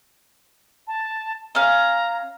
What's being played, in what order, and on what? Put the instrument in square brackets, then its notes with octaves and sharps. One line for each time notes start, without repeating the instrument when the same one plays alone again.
[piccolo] A5
[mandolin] C#4 F5 [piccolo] A#5